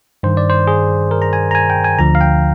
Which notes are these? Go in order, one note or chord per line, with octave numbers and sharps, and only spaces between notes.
G2 D#3 C5
D5
C5
G#4
A#4
A#5
G#5
A#5
G#5
G5
G#5
D2 D3 F3 A#5
F5
G5